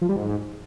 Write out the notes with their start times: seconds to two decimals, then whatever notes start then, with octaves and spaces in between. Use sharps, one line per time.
0.01 F3
0.09 G3
0.16 G#2